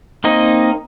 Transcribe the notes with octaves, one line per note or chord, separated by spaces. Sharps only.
A#3 C4 D#4 D#5